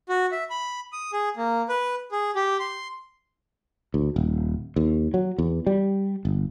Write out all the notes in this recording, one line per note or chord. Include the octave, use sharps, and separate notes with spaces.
F#4
E5
B5
D#6
G#4
A#3
B4
G#4
G4
C6
D2
D#1
D#2
F#3
E2
G3
G1